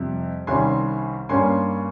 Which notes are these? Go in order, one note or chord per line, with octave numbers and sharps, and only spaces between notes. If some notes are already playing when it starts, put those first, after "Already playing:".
Already playing: F2 C3 G3
C2 C3 D#3 G3 C#4 G#5 C6
G2 G3 A#3 C#4 G#5 C6